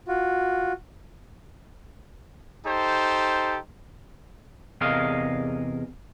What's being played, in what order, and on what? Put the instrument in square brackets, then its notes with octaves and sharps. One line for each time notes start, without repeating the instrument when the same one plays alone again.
[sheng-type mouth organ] F4 F#4
[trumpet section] D#4 G4 A4 C5
[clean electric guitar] E2 C3 G#4 A#4 D#5 F5